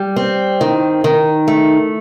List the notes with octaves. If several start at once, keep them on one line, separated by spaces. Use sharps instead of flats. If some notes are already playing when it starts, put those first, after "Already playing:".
Already playing: G3
C4
D#3
D#3
A3